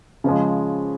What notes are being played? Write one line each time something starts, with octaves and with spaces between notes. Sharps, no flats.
C#3 F3 G#3